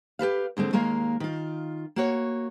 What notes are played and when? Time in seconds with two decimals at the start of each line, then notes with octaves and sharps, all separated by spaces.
0.19 G4 A4 B4 F5
0.57 D#2 D3 G#3 C4
0.73 D#2 G#3 A#3 A#4 F5
1.20 D#3 F4
1.96 A#3 F#4 C#5